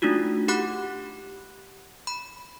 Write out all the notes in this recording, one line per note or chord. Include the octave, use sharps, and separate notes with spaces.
A3 D4 D#4 F4 F#4
G4 F#5 B5 D6 F#6
B5